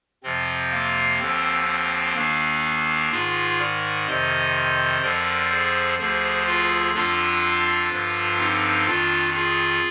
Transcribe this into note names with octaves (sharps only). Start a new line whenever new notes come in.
F2 C3 F3 C4
A#3
D#2 D3 F3 C4
C4
D#2 D#3 A#3 D4
G#2 D#3 F4 G#4
A#4 D5
F2 C3 D#3 C5 D#5
F2 D3 F3 A#4 D5
G#4 C5
D2 D3 F3 G#4 C5
F4 G#4
F2 D3 F3 D4 F4
G2 D3 F3
C4 D#4
F2 D#3 D4 F4
F4 G#4